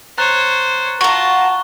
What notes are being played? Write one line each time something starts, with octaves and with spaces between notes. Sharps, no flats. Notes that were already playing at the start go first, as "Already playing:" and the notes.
C5 C#5 A#5 F#6 A6
F4 F#4 A5 A#5 C#6 G7